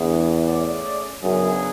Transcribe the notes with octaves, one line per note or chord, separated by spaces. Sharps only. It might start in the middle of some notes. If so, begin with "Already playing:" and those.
Already playing: E2 E3 A3 D4 G#4
A3 C#4 G#4 D5
F#2 C#3 F#3 B3 D4 G#4